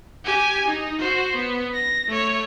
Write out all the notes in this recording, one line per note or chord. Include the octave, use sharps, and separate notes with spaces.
G4 G#5
D#4
F#4 C5
B3
A#6
A3 C#5